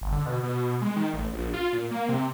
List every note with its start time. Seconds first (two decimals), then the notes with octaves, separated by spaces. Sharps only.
0.01 G1
0.12 D3
0.26 B2
0.43 B2
0.82 G#3
0.96 D#3
1.13 A1
1.34 A#1
1.54 F4
1.73 A#2
1.91 A#3
2.09 C3